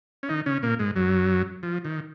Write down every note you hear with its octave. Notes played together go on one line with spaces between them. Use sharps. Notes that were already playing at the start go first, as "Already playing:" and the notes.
C#4
D#3 D#4
C#3 C#4
A#2 A#3
G#2 G#3
F#2 F#3
F3
D#3